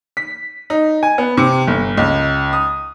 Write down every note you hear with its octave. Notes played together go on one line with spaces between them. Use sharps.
B6
D#4
G#5
B3
C3
G1
C#2
D#6